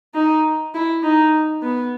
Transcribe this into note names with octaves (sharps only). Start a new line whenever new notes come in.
D#4
E4
D#4
B3